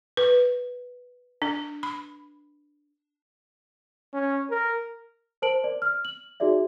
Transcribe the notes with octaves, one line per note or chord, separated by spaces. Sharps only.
B4
D4
B5
C#4
A#4
A#4 C5 A5 D7 F#7
D5
F6
F#7
D#4 F#4 G#4 D5 E5